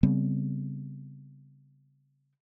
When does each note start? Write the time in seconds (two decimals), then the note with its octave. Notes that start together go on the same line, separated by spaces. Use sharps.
0.03 C#3 G3 B3 C4